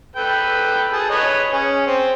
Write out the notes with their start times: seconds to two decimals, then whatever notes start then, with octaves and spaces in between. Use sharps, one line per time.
0.16 A4 B4 G5
0.93 G#4 A5
1.10 B4 C#5 D#5
1.53 C#4 G#4
1.87 C4